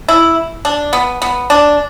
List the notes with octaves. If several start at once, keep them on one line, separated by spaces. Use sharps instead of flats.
E4
D4
B3
B3
D4